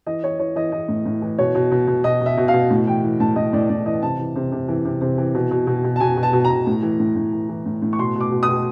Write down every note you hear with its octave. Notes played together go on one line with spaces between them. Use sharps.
E3 D#5
E3 C#5
E3 C#5
E3 D#5
E3 D#5
A2
A2
E3
B2 C#5
B2
B2
B2
B2 D#5
B2
E5
B2
F5
B2
A2
E3 G5
E3
A2 A5
A2 D#5
A2 D5
A2 D5
E3 D#5
C3 A5
E3
C3
C3
E3
C3
C3
E3
B2
B2
B2
B2
A5
B2 G#5
B2
A5
B2
A#5
B2
A2
E3
A2
A2
E3
E3
A2
A2
C#6
B2 C6
B2
D6
B2
D#6
B2